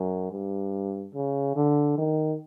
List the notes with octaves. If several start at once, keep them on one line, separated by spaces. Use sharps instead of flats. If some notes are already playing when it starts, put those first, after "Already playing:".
Already playing: F#2
G2
C#3
D3
D#3